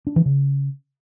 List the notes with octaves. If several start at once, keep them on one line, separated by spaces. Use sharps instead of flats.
D4
E3
C#3